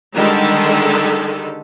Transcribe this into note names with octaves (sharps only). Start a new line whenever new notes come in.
D3 D#3 G3 G#3 A4